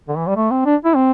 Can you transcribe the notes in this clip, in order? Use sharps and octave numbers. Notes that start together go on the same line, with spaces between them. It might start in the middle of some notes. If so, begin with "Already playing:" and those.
D3
E3
G3
A3
C4
D4
E4
C4